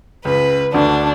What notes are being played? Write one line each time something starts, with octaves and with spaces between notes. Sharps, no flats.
C#2 C#3 B4
D2 D3 D4